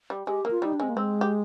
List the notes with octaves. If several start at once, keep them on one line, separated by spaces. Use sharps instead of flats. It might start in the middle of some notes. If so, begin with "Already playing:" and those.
G3
G#3 G4
A#3
F4
G3 D#4
D4
G#3 C4
A#3
G#3 C4
G4